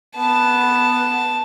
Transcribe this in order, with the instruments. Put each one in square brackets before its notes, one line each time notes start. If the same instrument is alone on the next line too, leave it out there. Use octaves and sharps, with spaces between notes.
[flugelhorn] B3 [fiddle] A5